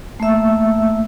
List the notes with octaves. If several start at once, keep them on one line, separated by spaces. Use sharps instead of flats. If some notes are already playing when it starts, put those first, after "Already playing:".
A3 A#3 E5 E6